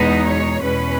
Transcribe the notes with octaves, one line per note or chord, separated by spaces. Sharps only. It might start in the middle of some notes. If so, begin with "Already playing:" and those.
Already playing: E2 B2 G#3 B3 D#4 D#5
C#5
E2 B2 G#3 C#4 B4